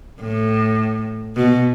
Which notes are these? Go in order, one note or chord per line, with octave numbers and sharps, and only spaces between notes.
A2
B2